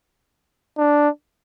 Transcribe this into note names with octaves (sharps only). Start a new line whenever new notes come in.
D4